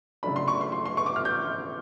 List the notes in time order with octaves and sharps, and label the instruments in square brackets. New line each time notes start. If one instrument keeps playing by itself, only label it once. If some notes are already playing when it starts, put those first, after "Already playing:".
[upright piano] C#3 F#3 A3 D4 B5
C6
C#6
C6
C6
C6
C#6
D6
F6
G6